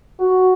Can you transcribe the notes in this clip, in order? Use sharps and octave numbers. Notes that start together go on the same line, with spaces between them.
F#4